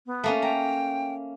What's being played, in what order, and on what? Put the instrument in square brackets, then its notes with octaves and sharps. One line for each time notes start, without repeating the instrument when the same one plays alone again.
[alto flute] B3
[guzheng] A3 A#3 C#4
[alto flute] G5 [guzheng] A#5